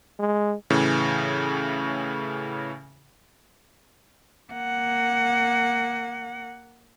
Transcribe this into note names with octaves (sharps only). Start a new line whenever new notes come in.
G#3
A2 C#3 E3
A#3 F#5